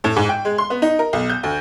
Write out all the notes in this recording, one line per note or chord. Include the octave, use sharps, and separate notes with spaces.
A2
G#2
G5
G#3
C6
B3
D#4
A#4
B1
G6
D2